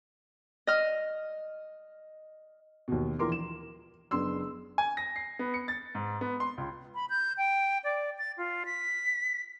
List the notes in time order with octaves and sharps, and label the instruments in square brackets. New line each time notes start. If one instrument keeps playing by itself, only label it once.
[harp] D#5 F6
[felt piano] D#2 B2
A#1 E3 F3 A#4 C6 D6
E7
F#1 B3 D4 C6 E6
[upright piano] G#5
A#6
C7
B3
C#7
A6
G#2
B3
C6
C#2
[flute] B5
G6
G5
D5
A6
F4
B6